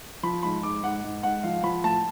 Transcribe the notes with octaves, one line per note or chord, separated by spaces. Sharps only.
F3 B5
G#2 B5
G#2 D6
G#2 F#5
G#2
G#2 F#5
F3 F5
F3 B5
A2 A5